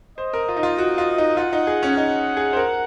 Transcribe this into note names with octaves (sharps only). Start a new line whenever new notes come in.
C5 D#5
A#4
F4
D#4
F4
F#4
F4
D#4
F4 F#5
D#4
G#4
C#4
D#4 F#5
G#4
C5
A#4